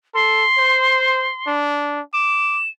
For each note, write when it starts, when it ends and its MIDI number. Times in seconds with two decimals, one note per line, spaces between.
0.14 0.45 69
0.14 1.55 84
0.58 1.30 72
1.47 2.01 62
2.13 2.59 86
2.13 2.69 100